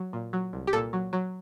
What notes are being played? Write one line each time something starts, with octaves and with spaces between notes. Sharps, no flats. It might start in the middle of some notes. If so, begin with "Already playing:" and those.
Already playing: F#3
A#2
F#3
C2
G4
A#2 A4
F#3
F#3